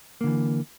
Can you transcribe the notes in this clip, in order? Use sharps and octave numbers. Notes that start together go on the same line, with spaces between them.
D3 E3 A#3